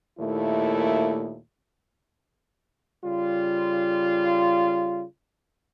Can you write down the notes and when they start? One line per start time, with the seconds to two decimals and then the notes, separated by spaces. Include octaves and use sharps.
0.20 D#2 A#2 A3 E4
3.05 C#3 G3 F4